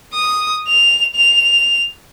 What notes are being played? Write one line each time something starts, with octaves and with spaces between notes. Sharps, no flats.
D#6
F7
F7